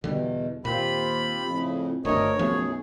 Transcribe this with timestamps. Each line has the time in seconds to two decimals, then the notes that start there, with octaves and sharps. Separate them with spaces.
0.04 E2 B2 D3 G3
0.65 D#2 A#2 C4 F4 G4 B5
1.48 F2 A2 C#3
2.05 D1 G1 D2 A#4 C#5 D#5
2.39 B1 F#2 F3 A3 G#4